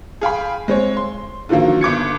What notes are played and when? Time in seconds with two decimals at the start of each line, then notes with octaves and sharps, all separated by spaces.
0.21 G#4 F5 G5 B5
0.68 G#3 C4 C#5
0.97 C6
1.49 D3 D#3 F3 F#3 A#3
1.81 G1 D6 G#6 C#7